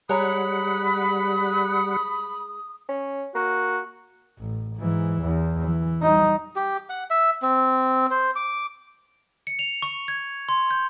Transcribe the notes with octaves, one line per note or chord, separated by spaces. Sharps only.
G3 G#3 C#5 F#5 A#5 B5 D#6
C#4
A#3 F#4
A1
G#2 E3
E2
E3
G3 D#4
G4
F#5
E5
C4
C5
D6
C#7
F7
C#6
G#6
C6
G6